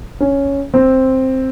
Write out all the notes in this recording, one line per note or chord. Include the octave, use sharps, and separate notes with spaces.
C#4
C4